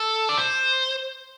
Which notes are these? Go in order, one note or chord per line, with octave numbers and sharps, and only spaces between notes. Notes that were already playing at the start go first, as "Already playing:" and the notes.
Already playing: A4
D5
C5